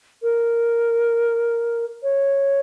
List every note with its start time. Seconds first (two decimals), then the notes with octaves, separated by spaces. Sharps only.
0.23 A#4
2.03 C#5